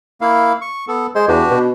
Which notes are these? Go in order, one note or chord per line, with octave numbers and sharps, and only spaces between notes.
A#3 E4 F5
C#6
B3 A4
G#3 C5 C6
E2 D4 F#4 G4
B2